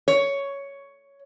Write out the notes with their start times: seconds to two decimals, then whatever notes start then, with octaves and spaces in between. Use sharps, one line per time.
0.08 C#5